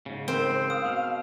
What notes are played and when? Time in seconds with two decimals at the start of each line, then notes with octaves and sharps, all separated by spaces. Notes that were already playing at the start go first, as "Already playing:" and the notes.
0.06 G#2 C#3
0.28 C4 A#4 C5
0.70 F5 D#6
0.86 B2